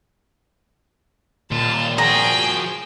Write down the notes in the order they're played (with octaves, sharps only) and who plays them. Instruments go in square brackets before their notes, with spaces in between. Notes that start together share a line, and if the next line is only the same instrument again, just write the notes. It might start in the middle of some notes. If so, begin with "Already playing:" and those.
[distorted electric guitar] D#2 F4 [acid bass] A#2 [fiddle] A5
[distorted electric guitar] F3 F#4 [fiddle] G#4 G5 [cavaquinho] A#5